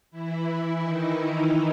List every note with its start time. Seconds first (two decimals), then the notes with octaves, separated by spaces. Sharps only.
0.11 E3 E4
0.81 D#3 D#4